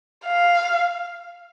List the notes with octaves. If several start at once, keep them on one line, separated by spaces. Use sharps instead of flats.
F5